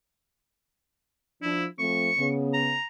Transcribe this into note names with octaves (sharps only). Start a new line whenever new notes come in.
F3 D4 E4
F3 A3 C4 C#6
C#3 B3
A#5